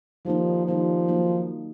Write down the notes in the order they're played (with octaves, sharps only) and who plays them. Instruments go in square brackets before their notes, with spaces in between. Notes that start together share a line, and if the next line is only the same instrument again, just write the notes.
[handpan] D#3 G3 A#3 D#4 [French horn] F3
[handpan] D#3 G3 A#3 D#4 [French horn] F3
[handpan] F#3 A#3 D#4